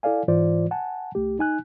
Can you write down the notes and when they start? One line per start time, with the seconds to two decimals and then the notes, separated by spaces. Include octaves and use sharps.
0.03 E4 A4 D5 F5 G#5
0.28 G#2 E3 F4 C5 D5
0.71 F#5 G#5 A5
1.15 C2 A3 G4
1.39 D#4 G#5 F#6